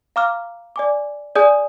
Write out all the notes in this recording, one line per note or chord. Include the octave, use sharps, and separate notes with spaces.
F5 A#5 D6 F6
D5 G#5 D6
G#4 D5 G#5 D#6 G6